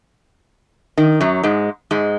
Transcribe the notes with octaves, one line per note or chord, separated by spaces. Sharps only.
D#3
F#2 F#3
G#2 G#3
G#2 G#3